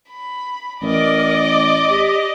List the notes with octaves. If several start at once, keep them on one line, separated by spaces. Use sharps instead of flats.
B5
A1 A#4 D5 D#5
D6
G4